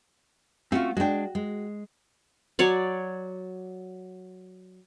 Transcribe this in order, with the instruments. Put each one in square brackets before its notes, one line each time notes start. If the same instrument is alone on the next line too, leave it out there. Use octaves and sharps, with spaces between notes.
[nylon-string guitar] A3 F#4 [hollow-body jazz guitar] C4 C#4 F4
[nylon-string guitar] G#3 D4 [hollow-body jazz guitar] F#4 G5
[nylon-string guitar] G#3
[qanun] F#3 C#5 D5